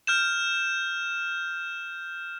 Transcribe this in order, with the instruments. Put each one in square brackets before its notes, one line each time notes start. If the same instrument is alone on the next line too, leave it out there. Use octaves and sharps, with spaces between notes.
[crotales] F6 G6 E7